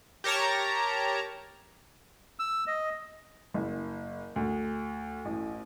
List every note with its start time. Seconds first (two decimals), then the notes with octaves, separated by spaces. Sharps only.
0.24 G4 A#4 C#5 A5 A#5
2.39 E6
2.67 D#5
3.54 F#1
4.36 D2
5.25 A1